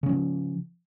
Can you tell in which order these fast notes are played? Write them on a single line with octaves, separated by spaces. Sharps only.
C#3 C#4 F3